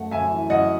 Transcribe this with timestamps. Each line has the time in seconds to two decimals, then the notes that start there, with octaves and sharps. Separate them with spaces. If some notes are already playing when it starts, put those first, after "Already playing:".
Already playing: F#2 A3 F#5
0.11 F#2 E5 G#5
0.30 E3
0.50 F#2 D#5 F#5